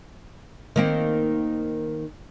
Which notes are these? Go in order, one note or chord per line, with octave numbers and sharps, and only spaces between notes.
D#3 A#3 C4